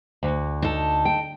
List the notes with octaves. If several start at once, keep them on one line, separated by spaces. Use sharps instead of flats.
D2
D#4 A4
G5